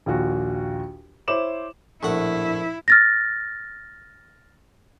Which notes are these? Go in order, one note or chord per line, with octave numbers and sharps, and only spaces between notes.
A#1 D#2 F4 F#4
E4 C5 C#5 D6 E7 F#7
A#1 A2 E4 F#5
F6 A6 A#6